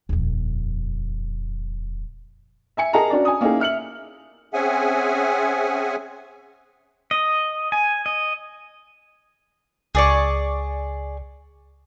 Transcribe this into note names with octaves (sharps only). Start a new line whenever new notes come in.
D#1 F2
E5 G#5 C#7
G#4 A#4 D#5 A5 A#5
C#4 D4 F#4 D5
G#5 D#6
A#3 C#4 D#4 E4 G#4
E5 F6 C#7 F#7
C4 C#4 G#4 E5 F#5 G#5
D#5
G#5
D#5
C#2 G#4 D5 C#6